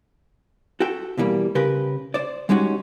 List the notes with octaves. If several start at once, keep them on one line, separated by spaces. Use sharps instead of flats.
F#4 A4 G5
B2 E3 G3 A#3
C#3 G4 A#4 B4
C5 D5
G3 G#3 C#4 D#4 F#4